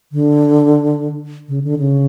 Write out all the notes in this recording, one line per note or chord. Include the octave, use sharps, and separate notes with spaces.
D3
C#3
D3
C#3